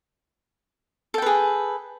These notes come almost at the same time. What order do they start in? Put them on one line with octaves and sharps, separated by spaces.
A4 G5 B4 G#4